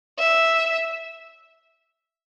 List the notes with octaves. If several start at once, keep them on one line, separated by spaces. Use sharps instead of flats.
E5